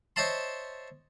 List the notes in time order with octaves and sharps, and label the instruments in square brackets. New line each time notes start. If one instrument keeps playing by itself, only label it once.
[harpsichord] C5 C#5 D#5 E5 A5 C6